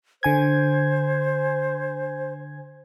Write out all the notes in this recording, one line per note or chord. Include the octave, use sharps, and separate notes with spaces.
D3 C5 G#5 G#6